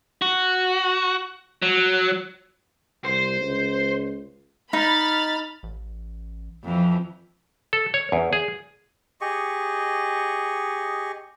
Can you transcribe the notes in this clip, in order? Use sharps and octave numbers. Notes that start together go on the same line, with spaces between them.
F#4
F#3
C2 C5
C#2
D#4 B5 F6 A6
A1
F2 E3 F3
A4
C#5
E2
G#4
G4 G#4 D#5 C#6